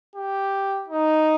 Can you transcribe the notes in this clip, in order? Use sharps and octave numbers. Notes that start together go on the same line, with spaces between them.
G4
D#4